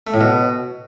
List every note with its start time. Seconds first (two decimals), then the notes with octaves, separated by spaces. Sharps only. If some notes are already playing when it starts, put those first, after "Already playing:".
0.07 A3
0.14 A2
0.21 B2